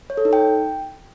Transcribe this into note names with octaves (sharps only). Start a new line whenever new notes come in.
C#5
A4
D#4
G5